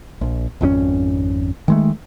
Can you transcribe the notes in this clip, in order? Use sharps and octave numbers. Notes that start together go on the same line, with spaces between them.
A#1
G#1 F2 D#3 C#4
D#3 G#3 A3